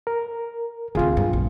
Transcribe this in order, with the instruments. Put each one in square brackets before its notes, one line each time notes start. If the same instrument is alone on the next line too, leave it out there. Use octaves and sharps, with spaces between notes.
[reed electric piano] A#4
[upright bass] D2 C3 [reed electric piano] F4 G#4
[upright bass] G2
A#1